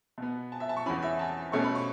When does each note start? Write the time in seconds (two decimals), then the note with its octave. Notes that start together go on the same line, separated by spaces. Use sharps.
0.18 B2 B3
0.52 A5
0.60 E5
0.69 A5
0.77 C#6
0.86 E2 C#3 E3 C#4 B5
1.03 E5
1.19 A5
1.52 B2 A3 C#4 C#6
1.64 B5
1.75 C#6